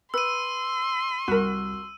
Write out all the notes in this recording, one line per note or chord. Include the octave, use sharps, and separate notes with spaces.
B4 C6 E6 D#7
C2 F#4 A#4